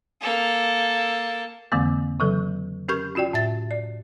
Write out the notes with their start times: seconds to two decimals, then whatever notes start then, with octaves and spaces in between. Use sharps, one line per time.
0.21 A#3 A4
1.72 F2 D3 E3 G#3 A#3 C4
2.20 C#3 E3 F#3 A4
2.89 C#4 G4 A#4 C#6 G6
3.15 C#4 F4 F#4 D5 G5
3.33 A2 E5 A6
3.71 D5